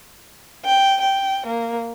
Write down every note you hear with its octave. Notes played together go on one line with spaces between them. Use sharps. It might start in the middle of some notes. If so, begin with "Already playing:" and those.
G5
G5
A#3